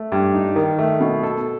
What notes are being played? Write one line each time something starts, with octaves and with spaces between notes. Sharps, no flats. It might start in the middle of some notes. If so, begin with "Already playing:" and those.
Already playing: A3
G2
D#4
D#3
A3
B2
A4